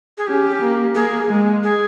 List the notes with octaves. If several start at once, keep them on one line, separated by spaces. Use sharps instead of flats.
G#4
C#4 G4
A#3
A#3 G#4
G#3
G#4